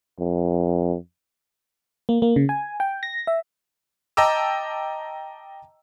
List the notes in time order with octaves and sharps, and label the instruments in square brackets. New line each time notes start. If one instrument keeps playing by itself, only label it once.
[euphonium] F2
[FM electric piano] A#3
A#3
C#3
G#5
G5
A#6
E5
[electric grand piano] D#5 G5 A5 A#5 D6 E6